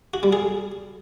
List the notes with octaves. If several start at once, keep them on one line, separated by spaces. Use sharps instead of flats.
F#4
G3
G#4